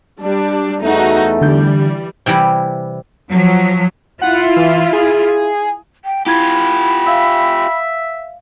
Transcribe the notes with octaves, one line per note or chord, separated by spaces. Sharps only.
G3 D4
E2 A3 D#4 F#4
D3 E3 G3 G6
C3 E3 G3 E4 B5
F3 F#3
E4 F4 F#5
E3
G#4
G5
E4 F4 G4 B5 G#6
E5 F5